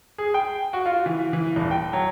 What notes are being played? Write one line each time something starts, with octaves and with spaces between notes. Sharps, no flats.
G#4
G5
F#4
F4
E3
E3
D#1
G5
F#3